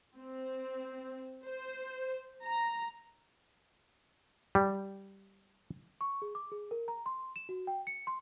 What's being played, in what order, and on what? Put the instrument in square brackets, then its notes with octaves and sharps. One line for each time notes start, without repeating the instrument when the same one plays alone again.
[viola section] C4
C5
A#5
[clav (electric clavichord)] G3
[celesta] C#6
G#4
D6
G#4
A#4
A#5
C6
E7
F#4
G5
C#7
C6